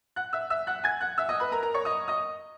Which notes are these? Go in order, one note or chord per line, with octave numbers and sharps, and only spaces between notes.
F#5 F#6
E5 E6
E5 E6
F#5 F#6
G#5 G#6
F#5 F#6
E5 E6
D#5 D#6
B4 B5
A#4 A#5
A#4 A#5
C#5 C#6
D#5 D#6
D#5 D#6